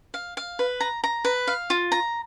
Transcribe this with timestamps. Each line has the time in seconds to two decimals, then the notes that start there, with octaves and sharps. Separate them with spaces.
0.14 F5
0.37 F5
0.59 B4
0.80 A#5
1.04 A#5
1.25 B4
1.47 F5
1.70 F4
1.92 A#5